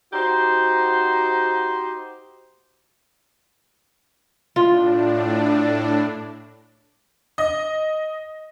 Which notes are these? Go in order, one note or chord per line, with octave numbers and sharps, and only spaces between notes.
D#4 F#4 G4 C5
A2 D4 F4
D#5